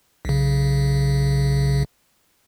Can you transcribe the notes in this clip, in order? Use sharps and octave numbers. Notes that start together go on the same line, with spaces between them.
B1 C#3